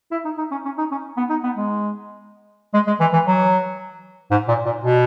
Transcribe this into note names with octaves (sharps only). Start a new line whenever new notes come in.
E4
D#4
D#4
C#4
C#4
D#4
C#4
B3
D#4
B3
G#3
G#3
G#3
E3
E3
F#3
G#2
A#2
A#2
B2